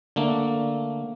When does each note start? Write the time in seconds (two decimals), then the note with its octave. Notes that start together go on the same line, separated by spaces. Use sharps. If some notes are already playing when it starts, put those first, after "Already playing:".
0.16 D3 A3 A#3